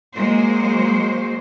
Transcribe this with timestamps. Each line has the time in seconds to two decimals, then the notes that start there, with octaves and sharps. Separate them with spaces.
0.15 F#3 G#3 A#3 C5